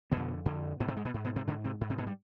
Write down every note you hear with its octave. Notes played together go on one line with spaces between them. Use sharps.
F2 B2 D3 B3
F2 D3
G#2 B2 B3
C3 C4
G#2 G#3
B2 B3
G#2
B2 B3
C3 C4
G#2 D3 D4
C3 C4
G#2
C3 C4
B2 B3
G3